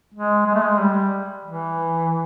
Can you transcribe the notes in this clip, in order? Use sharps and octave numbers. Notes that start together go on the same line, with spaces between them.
G#3
G#3
A3
G#3
G3
E3